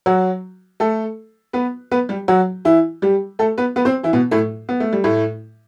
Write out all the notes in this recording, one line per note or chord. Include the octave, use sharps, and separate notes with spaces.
F#3 F#4
A3 A4
B3 B4
B3 B4
G3 G4
F#3 F#4
E3 E4
G3 G4
A3 A4
B3 B4
B3 B4
C4 C5
E3 E4
B2 B3
A2 A3
B3
A3
G3
A2 A3